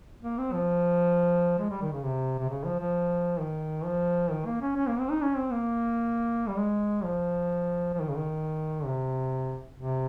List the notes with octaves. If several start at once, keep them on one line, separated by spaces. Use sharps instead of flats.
A#3
C4
F3
G#3
G3
D#3
C#3
C3
C3
C#3
F3
F3
D#3
F3
D#3
A#3
C#4
C#4
A#3
C4
D#4
C#4
C4
A#3
G3
G#3
F3
F3
D#3
C#3
D#3
C3
C3